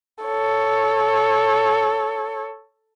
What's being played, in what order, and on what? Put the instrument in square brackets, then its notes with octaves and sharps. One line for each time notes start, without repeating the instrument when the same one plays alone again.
[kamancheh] A4 C#5